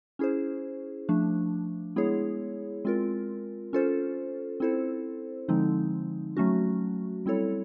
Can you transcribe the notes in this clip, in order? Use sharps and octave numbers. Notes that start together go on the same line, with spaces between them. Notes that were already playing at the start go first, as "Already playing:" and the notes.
C#4 E4 G#4 C5
F3 A3 D4
G#3 B3 E4 G#4 C#5
G#3 C4 F4 A#4
C#4 F4 A4 C5
C4 E4 A4 C5
D3 F3 G#3 C4 D#4
F#3 A3 C#4 F#4
G3 C4 E4 A4 C#5